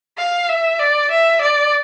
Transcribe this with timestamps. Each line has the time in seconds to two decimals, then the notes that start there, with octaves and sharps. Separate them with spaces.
0.18 F5
0.49 E5
0.79 D5
1.11 E5
1.42 D5